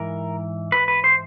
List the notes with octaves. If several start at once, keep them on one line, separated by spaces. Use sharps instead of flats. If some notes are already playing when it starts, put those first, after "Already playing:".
Already playing: G#2 E3 A#4
B4
B4
C5